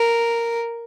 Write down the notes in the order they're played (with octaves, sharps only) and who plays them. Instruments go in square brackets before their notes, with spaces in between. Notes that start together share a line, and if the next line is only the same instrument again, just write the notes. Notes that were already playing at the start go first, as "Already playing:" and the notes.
Already playing: [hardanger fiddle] A#4